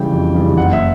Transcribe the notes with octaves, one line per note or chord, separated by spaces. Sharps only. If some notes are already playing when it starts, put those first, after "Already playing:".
Already playing: C#3 E3 G3 G5
F2
C#3 E3 G3
F#1 F#5
E5